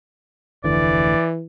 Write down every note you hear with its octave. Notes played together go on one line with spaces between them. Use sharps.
F1 D2 D3 E3 D5